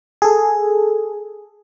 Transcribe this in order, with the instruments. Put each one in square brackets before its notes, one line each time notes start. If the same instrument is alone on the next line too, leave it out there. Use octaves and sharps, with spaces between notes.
[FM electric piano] G#4 A4